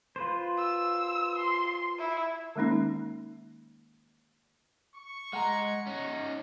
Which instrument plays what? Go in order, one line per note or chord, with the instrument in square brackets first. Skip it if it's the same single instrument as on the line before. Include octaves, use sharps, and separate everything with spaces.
[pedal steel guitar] F4 B4 C5
[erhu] E6
C6
E4
[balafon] D#3 G#3 A#3 C#4 D#4
[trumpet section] C#6
[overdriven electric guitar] G#3 [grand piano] F#5 A#5
[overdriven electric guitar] C#4 D#4